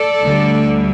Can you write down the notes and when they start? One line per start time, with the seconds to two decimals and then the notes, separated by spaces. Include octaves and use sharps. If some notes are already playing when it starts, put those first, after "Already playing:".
Already playing: A4 D5
0.23 D2 D3 G3